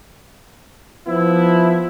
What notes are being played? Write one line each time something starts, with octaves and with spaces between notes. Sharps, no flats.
F3 B3 E4